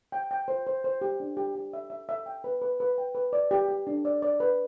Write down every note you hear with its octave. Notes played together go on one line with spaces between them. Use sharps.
G5
G5
C5
C5
C5
G4
D4
G4
G4
E5
E5
E5
G5
B4
B4
B4
G5
B4
D5
G4
G4
D4
D5
D5
B4